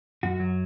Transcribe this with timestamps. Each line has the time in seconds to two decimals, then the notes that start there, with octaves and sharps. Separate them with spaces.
0.23 F#2 F#4
0.40 F#3